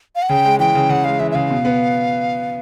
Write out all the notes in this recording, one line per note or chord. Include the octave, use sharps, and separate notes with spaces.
F5
F#5
C#3 G5
G#3
E3 G5
C#3
C#3 F#5
G#3 F5
E3 E5
E5
C#3 F5
B2
B3